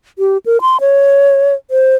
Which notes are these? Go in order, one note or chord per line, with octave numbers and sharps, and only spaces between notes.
G4
A#4
C6
C#5
C5